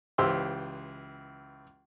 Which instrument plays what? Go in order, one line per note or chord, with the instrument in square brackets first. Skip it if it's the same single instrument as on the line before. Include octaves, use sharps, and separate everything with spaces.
[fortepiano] C#2 E3 G4 C5 C6 E6